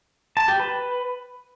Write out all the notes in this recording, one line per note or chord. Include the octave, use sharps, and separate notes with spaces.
A5
G4
B4